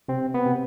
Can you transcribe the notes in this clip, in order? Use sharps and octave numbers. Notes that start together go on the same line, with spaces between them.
C3 C4
B3
C3